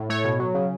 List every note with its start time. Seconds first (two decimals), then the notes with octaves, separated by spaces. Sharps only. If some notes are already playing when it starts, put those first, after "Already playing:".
Already playing: A2
0.09 A3 C#5
0.24 B2
0.39 F#3
0.54 C#3